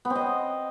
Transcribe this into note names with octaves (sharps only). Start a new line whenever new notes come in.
B3
C4
D#5